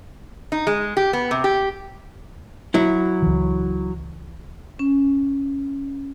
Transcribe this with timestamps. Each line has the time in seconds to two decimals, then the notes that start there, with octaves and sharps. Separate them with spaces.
0.52 D#4
0.67 G#3
0.97 G4
1.13 B3
1.31 C3
1.44 G4
2.74 F#3 E4
3.22 C#2 E3
4.79 C#4